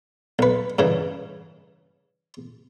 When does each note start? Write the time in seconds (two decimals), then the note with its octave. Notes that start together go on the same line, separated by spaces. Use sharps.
0.39 B1 B4
0.79 G2 C#3 E3